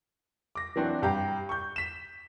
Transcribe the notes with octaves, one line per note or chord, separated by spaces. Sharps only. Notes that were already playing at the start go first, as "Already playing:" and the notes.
D6 A#6
E3 F#3 C4 D4 F#4
G2 G4 G5 A#5
C#6 G6
B6 E7